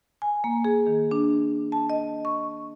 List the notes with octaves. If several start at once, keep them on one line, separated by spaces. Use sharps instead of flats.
G#5
A#3
G#4
D#3
D4
A5
D#5
C#6